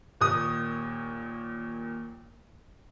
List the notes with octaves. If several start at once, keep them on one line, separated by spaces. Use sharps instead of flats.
D#2 A#2 D#6